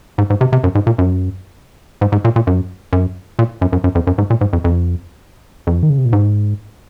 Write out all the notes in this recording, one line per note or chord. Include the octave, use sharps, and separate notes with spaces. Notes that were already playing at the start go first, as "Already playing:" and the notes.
G#2
G#2
C3
C3
F#2
G#2
A#2
F#2
G#2
G#2
A#2
A#2
F#2
F#2
A#2
F#2
F#2
F#2
F2
F#2
G#2
A#2
G#2
F2
F2
F2
D#3
C#3
C3
A#2
G#2